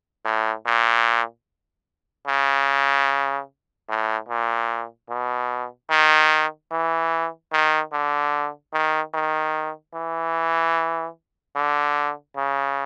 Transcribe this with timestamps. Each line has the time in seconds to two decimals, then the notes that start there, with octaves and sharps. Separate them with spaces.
0.25 A2
0.66 A#2
2.27 C#3
3.89 A2
4.29 A#2
5.10 B2
5.90 D#3
6.71 E3
7.53 D#3
7.93 D3
8.73 D#3
9.14 D#3
9.94 E3
11.56 D3
12.37 C#3